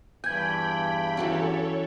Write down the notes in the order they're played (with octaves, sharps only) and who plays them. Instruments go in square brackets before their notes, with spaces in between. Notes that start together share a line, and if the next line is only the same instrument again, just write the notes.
[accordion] E2 G2 [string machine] G5 B5 [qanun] G#5 [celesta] G6 G#6
[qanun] E3 F#3 C#4 [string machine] A4 C#5